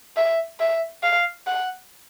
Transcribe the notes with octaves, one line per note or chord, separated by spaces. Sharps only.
E5
E5
F5
F#5